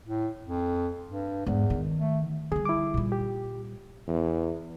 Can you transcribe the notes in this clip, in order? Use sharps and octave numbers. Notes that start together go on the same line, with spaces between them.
A2
F2
G2
E2 G#2
D#3
A3
D3 G3 G#4
E4 D6
A#2 G3
G4
E2